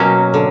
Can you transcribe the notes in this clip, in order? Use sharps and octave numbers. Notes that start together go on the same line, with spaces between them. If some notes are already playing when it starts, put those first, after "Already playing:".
Already playing: B2 F#3 A#3 C#4
D3